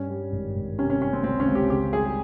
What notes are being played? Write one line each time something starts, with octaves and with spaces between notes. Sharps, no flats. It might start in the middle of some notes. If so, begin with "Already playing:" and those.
Already playing: G2 C#4
G3
G#1
G#1
C3 C#4
C#4
G3 C#4
C4
C#2 C4
C#4
C#2
G4
C#3 G4
G3 G#4